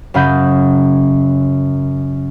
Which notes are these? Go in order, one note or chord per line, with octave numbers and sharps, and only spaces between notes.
F#2 C#3 F#5 B5 D#6 G6